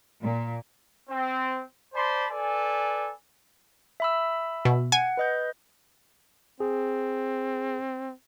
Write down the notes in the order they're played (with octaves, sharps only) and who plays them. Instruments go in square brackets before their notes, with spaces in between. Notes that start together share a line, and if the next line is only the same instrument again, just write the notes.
[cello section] A#2
[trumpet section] C4
C5 D5 A5 B5 C6
A4 B4 D5 G#5
[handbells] E5 B5 E6
[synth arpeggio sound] B2
[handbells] F#5 [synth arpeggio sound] G#5
[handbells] B4 D#5 G6
[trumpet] C4 [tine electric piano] G#4